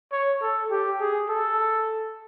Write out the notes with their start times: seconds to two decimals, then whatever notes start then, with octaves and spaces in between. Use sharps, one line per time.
0.12 C#5
0.42 A4
0.71 G4
1.00 G#4
1.29 A4